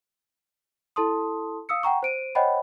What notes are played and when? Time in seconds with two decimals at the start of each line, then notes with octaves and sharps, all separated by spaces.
0.96 E4 A4 A5 C6 D#6
1.69 F5 D#6 E6 C#7
1.83 F#5 G5 A#5 C#6
2.03 C5 D7 D#7
2.35 C5 C#5 D#5 F#5 G5 B5